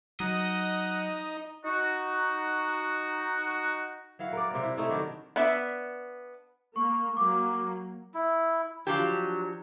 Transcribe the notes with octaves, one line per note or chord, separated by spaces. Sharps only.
F#3 D#4 D#5 F#5
D#4 F#4
F#3 E4 F5 F#5
A#4 D5
C3 C4 D5
E4
A3 D#4 E4
D3 D#3 F#3 D4
B3 D4 E5
A#3 C#6
F#3 A#3 D6
E4
F3 F#3 D4 G4